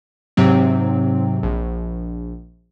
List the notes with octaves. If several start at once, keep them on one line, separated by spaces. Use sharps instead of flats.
G#2 C3 F#3 C4
A#1